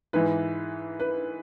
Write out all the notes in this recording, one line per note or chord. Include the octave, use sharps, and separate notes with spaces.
G#2 E3 B4
B4